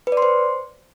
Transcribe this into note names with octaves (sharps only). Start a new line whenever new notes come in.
B4
D5
C6
C5